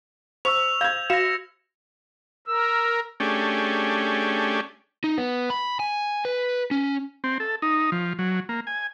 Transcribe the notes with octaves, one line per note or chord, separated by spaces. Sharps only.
C5 C#6 E6 F7
F5 G6 G#6
F#4 F5 A#6 C#7 E7
A#4 E6
A3 C#4 D4 G4 G#4
D#4
B3
B5
G#5
B4
C#4
C4
A4
D#4
F3
F#3
A#3
G#5